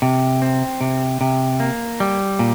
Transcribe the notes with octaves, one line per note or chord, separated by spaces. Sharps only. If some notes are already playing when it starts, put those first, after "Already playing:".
C3
C4
C3
C3
A#3
G3
A#2